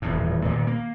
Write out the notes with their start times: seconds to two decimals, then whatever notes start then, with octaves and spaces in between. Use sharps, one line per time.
0.02 D#1 E2 A2
0.45 A#2 D#3
0.67 A#3